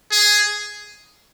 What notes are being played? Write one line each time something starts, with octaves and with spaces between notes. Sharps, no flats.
G#4